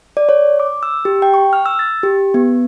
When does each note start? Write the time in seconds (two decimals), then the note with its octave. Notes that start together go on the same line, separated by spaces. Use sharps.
0.17 D5
0.29 C#5
0.60 D6
0.83 E6
1.05 G4
1.22 G5
1.34 C#6
1.53 F6
1.66 E6
1.79 A6
2.03 G4
2.34 B3